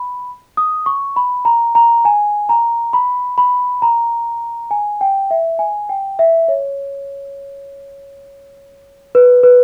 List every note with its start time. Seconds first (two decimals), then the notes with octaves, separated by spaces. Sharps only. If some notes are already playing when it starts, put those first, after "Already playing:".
Already playing: B5
0.57 D#6
0.86 C#6
1.16 B5
1.45 A#5
1.75 A#5
2.05 G#5
2.49 A#5
2.93 B5
3.38 B5
3.82 A#5
4.71 G#5
5.01 G5
5.31 E5
5.59 G#5
5.89 G5
6.19 E5
6.48 C#5
9.15 B4
9.43 B4